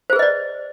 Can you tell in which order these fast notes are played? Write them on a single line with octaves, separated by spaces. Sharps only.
C5 G#4 B4 D#5 D5